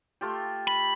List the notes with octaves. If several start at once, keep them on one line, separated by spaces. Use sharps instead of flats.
A3 F4 G4
B5